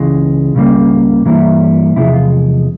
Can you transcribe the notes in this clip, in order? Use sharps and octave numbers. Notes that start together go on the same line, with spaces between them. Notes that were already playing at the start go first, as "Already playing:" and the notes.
Already playing: C#2 C#3 E3 G#3 F4
C#2 C#3 G3 A#3
G2 E3 G3 A#3 E4
E2 C3 F3 G#3 E4
F4